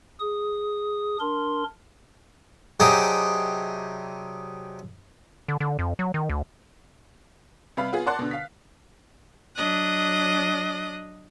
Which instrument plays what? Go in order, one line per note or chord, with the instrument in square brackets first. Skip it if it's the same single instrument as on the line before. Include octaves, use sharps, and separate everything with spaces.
[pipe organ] G#4 D#6
D4 A#4 C6
[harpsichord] C3 F#3 D4 D#4 G4 G#4
[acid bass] D3
D3
F2
F#3
D#3
D2
[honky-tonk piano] C3 G3 B4 F5 B5
B3 F4 G#4
A#4 D5 F#5 A5 C6 F#6
B2 D3
F5 B6
[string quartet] F#3 D4 D#5 D#6 F#6